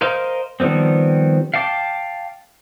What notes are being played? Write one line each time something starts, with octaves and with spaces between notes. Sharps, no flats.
A#4 C5 D#5 F5
D#3 F3 G3 B3 C4
F5 G5 A5 D6